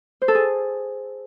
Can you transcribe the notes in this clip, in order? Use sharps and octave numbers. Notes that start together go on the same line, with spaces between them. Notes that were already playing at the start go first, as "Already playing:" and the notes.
C5
A4
G#4